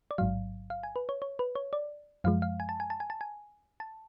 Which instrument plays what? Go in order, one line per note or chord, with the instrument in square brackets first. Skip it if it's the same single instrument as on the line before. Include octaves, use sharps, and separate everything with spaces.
[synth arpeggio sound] D5
A1 G#2 F#3 F5
F5
G#5
B4
C#5
C#5
B4
C#5
D5
F#2 F3 G#3 F5
F5
G#5
A5
G#5
A5
G#5
A5
G#5
A5